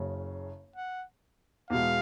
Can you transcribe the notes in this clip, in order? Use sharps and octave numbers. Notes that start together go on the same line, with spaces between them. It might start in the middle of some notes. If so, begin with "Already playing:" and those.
Already playing: F#1 F#2 C#3
F#5
E2 B2 G#3 F5